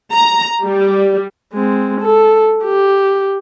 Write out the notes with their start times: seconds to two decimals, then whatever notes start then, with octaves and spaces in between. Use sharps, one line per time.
0.12 A#5
0.65 G3
1.54 G#3 C4
2.01 A4
2.64 G4